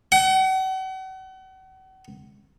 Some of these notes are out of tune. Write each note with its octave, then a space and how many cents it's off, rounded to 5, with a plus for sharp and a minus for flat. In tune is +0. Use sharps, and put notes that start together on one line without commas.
F#5 +40